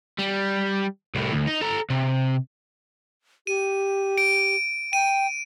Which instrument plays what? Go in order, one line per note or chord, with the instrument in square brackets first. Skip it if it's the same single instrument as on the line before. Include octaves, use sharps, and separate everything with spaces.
[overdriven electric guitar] G3
C2 A2
D2
D#4
A4 A#5
C3
[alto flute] G4 [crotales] D#7
[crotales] D7
[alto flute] G5 [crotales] D#7